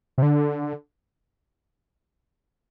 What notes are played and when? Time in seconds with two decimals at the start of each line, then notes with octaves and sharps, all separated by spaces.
0.18 C3
0.22 D3